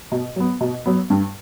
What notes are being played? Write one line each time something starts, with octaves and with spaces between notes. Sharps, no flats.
B2
F#3 B3
B2
F#3 B3
G2